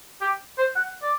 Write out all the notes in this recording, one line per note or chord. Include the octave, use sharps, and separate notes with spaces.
G4
C5
F#5
D5